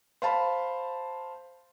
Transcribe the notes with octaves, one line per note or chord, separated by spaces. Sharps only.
C5 F5 A5 B5